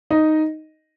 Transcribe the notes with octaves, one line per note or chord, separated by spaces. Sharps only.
D#4 D#5